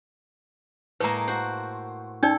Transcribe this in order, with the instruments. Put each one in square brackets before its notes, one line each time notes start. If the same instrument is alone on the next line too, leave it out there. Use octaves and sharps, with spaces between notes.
[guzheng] A2 G#3 A#3 [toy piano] B4 A#5
[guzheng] F#4 C5
[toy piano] C#4 D#4 D5 [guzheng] A4